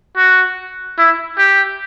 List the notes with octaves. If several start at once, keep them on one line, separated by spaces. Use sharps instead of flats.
F#4
E4
G4